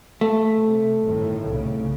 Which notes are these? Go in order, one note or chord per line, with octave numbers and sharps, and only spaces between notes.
A3
C3
G1 A2 D#3
C2 C#3